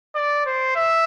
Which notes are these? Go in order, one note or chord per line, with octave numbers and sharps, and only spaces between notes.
D5
C5
E5